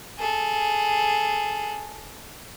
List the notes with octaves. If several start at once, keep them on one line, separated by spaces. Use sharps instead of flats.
G#4 A4